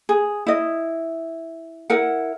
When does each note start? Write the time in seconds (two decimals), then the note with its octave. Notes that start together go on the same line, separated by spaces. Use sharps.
0.09 G#4
0.47 E4 D#5
1.90 E4 A#4 F#5